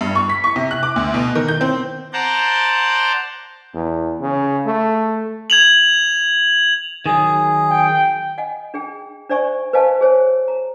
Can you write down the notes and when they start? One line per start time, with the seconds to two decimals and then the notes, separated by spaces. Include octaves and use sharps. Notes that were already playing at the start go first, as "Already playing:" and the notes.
0.01 G2
0.15 C#6
0.30 B6
0.44 C#6
0.56 C3
0.71 F#6
0.83 D6
0.96 D2
1.14 B2
1.35 D#3
1.48 G6
1.61 C4
2.13 C5 D5 F#5 A5 A#5 G6
3.74 E2
4.21 C#3
4.66 A3
5.50 G#6 F7 F#7
7.06 D#3 F#3 G#4
7.69 G5
8.38 D#5 F#5 G#5
8.74 D4 G#4 G5
9.30 D4 C5 D5 E5 G#5 C#6
9.73 B4 C5 D#5 F5 G#5 A5
10.01 G#4 C5 C#5 G#5
10.48 A#5